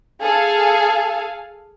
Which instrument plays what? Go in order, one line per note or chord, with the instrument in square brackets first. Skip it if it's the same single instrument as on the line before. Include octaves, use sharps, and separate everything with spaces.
[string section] G#4 A4 F5